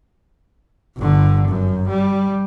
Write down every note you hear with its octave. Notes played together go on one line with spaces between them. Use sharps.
G1 D3
F#2
G3